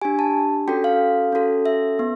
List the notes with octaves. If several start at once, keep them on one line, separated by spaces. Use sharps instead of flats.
D4 G4 G#5
A5
C#4 F#4 A4 G5
F5
C#4 F#4 A4
E5
B3